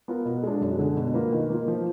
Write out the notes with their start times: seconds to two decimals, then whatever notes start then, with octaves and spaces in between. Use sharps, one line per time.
0.08 B3 F4 A#4
0.25 B2
0.43 G#3 D4
0.61 F#2
0.78 D3 G#3
0.97 B2
1.14 A#3 F4 B4
1.32 D#3
1.50 A#3 F4
1.68 F3